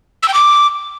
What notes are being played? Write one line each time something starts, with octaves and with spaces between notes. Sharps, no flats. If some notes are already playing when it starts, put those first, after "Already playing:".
E6
G5
D6